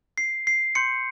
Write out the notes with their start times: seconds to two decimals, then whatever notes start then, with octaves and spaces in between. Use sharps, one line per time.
0.18 C7
0.47 C7
0.75 C6 G6 C#7